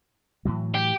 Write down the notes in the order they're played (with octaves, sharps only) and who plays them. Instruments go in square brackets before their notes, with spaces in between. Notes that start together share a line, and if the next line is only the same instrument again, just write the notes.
[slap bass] A2 E3 F#3
[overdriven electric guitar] G4